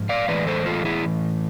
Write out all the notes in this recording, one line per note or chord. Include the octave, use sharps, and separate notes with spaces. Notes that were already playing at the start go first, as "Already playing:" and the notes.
Already playing: G#2 F3
D5 F5
A2 E3 G#3 B4 D5
A4 C5
F4 A4
E4 G#4